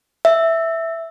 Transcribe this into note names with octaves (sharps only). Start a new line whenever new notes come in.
E5